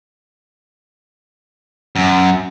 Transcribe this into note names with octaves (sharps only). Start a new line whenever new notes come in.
F#2